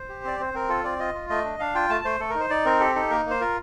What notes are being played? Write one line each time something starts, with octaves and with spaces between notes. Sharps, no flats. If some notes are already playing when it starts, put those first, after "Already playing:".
Already playing: C5
G4
C4 D5
C4 C5
C4 A#4
F4 A4
C4 D5
F4 D#5
F4
A3 D#5
D4
D4 F5
F4 G5
A3 A5
A3 C5
A3 A4
D#4 A#4
C5
D#4 D5
C4 A#4
G4 A4
D#4 A4
A#3 A#4
A#3
C5
F4 A#4